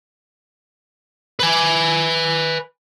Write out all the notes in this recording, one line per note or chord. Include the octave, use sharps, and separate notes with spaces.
B4 G#5